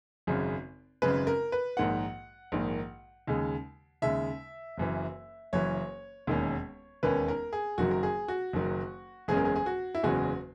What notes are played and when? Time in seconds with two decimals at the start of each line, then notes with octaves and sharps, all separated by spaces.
0.27 G#1 F#2 C#3 G#3
1.02 G#1 F#2 C#3 G#3 B4
1.27 A#4
1.52 B4
1.77 A#1 G#2 D#3 A#3 F#5
2.52 A#1 G#2 D#3 A#3
3.27 D#2 C#3 G#3
4.02 D#2 C#3 G#3 E5
4.78 F#1 F#2 E3
5.53 F#1 F#2 E3 C#5
6.27 E1 D#2 D#3 A#3 C#4
7.03 E1 D#2 D#3 A#3 C#4 B4
7.28 A#4
7.53 G#4
7.78 F#1 F#2 D#3 F#3 F#4
7.91 A#4
8.03 G#4
8.28 F#4
8.53 F#1 F#2 D#3 F#3
9.28 F#1 E2 C#3 G#3 C#4 G#4
9.37 A#4
9.45 G#4
9.56 G#4
9.66 F#4
9.95 E4
10.03 F#1 E2 C#3 G#3 C#4 F#4